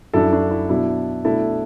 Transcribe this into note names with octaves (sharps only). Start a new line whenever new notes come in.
F#2 F#3 D4 E4 A4
D4 F#4
E4
B2 F#3 D4 E4
B2 A3 D4 E4 A4